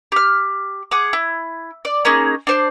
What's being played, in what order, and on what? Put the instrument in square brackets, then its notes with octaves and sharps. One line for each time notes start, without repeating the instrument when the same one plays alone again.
[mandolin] G4 F6
G#4 F#5 D6
E4
D5
A#3 C#4 D#4 G#4
D4 C5 D5